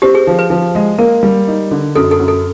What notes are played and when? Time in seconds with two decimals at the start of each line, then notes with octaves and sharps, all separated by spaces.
0.02 C4 G4
0.15 G#4
0.27 F3
0.39 B4
0.50 F3
0.75 G#3
0.98 A#3 A#4
1.23 G3
1.48 D#4
1.71 D3
1.95 F#2 A4
2.11 A4
2.20 F#2
2.28 A4